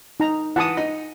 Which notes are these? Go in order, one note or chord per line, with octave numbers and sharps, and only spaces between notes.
D#4 A#5
E3 F#5 A5 D#6
D#4